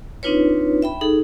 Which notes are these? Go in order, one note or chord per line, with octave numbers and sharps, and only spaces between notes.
C4 D4 D#4 F4 B4 C#5
E5 G5 B5
D#4 G#4 A4